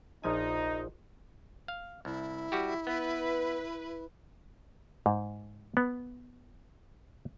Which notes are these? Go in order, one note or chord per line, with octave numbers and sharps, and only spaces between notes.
A#1 F3 D#4 G#5
F5
C2 E4
G3 F#4 G4
B3 B4
G#2
B3